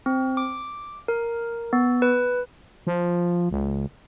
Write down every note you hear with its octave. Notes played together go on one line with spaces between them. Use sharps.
C4
D6
A#4
B3
B4
F3
C#2